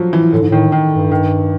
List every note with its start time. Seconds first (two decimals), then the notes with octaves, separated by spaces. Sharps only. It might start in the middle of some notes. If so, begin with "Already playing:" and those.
Already playing: F3 F#3
0.13 E3
0.32 A2 D3
0.41 G#2
0.50 A2 D#3
0.72 D#3
0.92 G2
1.12 D#3